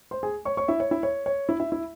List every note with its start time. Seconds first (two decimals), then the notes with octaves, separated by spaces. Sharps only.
0.11 C5 C6
0.23 G#4 G#5
0.45 C#5 C#6
0.57 C#5 C#6
0.68 E4 E5
0.80 C#5
0.91 E4 E5
1.03 C#5
1.26 C#5
1.49 E4 E5
1.60 E4 E5
1.72 E4 E5